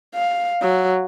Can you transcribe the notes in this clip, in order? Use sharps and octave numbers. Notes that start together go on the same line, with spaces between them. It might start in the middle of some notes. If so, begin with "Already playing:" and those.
F5
F#3